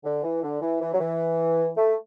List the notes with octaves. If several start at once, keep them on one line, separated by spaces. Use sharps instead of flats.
D3
E3
D3
E3
E3
F#3
E3
A3